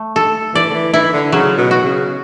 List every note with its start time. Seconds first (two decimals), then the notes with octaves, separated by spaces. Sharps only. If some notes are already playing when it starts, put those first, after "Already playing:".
Already playing: A3
0.16 A4
0.54 E3 D5
0.70 D3
0.74 E3
0.93 E3 E4
1.13 D3
1.32 C#3 F#3
1.58 B2
1.71 F#4
1.84 C#3